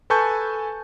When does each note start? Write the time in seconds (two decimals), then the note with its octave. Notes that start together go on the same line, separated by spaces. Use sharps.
0.10 A4 B4 G#5 A5 C#6 G6